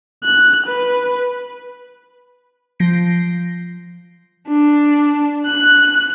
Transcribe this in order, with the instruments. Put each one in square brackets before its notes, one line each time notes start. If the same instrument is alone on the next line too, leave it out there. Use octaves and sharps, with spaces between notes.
[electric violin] F#6
B4
[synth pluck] F3 G6 A#6 C7 D7
[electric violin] D4
F#6